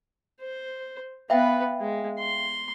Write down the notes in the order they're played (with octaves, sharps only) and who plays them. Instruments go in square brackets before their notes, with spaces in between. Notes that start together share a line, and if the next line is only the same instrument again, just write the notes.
[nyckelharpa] C5
[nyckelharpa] B3 B4 [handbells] E5 F5 G5
[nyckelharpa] G#3
C6